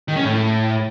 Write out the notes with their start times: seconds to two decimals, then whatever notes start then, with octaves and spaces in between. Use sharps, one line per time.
0.08 D#3
0.16 C#4
0.25 A2